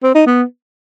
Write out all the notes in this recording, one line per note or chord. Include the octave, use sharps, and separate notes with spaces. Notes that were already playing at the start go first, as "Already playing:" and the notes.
C4
D#4
B3